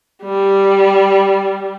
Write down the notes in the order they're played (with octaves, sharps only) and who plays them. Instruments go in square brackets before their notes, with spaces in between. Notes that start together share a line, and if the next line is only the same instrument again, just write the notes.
[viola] G3